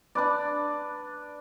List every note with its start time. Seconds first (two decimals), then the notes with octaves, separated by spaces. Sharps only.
0.15 D4 B4 D5